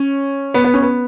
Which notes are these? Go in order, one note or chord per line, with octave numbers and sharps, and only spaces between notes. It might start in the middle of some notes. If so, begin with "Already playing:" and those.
Already playing: C#4
B3
B3
C#4
B3